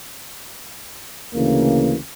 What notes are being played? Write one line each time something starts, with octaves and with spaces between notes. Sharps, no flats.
D2 C#3 E3 A#3